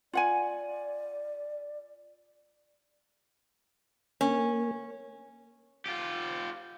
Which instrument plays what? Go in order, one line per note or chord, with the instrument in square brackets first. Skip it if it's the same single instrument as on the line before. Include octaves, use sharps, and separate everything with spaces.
[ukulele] F4 F#5 G#5 [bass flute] D5
[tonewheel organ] A#3 [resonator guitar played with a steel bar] C#4
[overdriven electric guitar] F4 G4